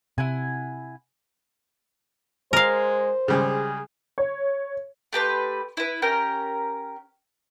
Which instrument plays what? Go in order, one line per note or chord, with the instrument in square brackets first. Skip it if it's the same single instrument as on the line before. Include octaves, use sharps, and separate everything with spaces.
[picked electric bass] C3 [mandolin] E4 F#5 G#5
[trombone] G#3 [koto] A#4 F5 [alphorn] C5
[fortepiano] C#3 G3 G#3 [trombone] G#4
[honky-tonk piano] C#5
[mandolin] A3 G4 B4 C6
E4 B4
C#4 G4 A#4